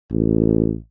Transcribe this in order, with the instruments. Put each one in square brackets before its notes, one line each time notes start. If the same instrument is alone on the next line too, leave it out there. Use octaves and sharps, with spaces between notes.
[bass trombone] A1